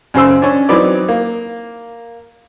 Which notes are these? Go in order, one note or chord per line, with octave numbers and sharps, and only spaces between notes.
F#2 C#3 C5 E6
C#4 D4
E3 F#3 C4 D#4 B4 D5
A#3